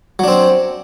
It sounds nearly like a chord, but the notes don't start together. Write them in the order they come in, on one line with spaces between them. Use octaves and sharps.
F#3 D4 C4